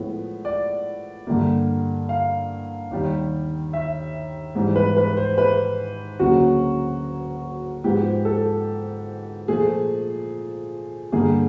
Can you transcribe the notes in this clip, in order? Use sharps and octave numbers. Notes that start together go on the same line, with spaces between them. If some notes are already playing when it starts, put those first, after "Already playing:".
Already playing: A2 F3 G#3 B3
D5
G2 D3 G3 A#3
F5
D#2 D#3 G3
E5
G#2 E3 G3
B4
B4
C5
B4
D2 C#3 F#3 A#3 F#4
G#2 F3 G#3 B3 G4
A4
A#2 F3 A3 G#4
G2 D3 G3 A#3 G#4